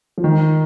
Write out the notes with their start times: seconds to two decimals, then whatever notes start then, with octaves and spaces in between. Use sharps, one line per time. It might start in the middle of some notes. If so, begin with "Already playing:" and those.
0.18 F3
0.24 D#3